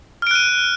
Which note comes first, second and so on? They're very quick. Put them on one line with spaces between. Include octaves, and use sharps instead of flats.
F6 D7 F#6 D#7